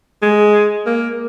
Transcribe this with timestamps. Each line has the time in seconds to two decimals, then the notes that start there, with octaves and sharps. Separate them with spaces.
0.22 G#3
0.86 A#3